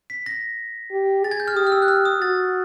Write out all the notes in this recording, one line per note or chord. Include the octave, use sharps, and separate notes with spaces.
B6
A#6
G4
G#4 A6
G#6
G6
F6
G4 D#6
F6
E6
F#6
F6
D#6
F#4 A6